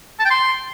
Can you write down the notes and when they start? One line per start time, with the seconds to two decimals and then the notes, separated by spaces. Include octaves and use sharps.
0.20 A5
0.25 G5
0.31 C6